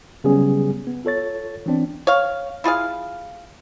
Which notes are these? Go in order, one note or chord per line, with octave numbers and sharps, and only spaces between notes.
C#3 F#3 G3 B3 C#4 G#4
B3
F4 A4 C#5 A6
E3 B3 C4 D4
C#5 F5
E4 F4 G#4 F5